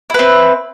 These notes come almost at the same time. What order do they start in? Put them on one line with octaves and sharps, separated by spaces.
E4 B4 C4